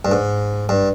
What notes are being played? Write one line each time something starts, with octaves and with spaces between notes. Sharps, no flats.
G2
G#2
G2